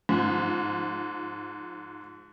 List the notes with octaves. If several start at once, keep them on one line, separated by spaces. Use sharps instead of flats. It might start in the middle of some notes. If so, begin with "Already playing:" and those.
G#2 F3